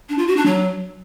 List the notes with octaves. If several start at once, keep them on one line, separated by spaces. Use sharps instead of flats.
D4
F4
F#4
D4
F#3